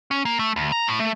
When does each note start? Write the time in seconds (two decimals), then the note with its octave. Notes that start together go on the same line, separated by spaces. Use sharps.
0.11 C#4
0.25 A#3
0.39 A3
0.56 D2
0.72 A#5
0.87 A2
1.00 A3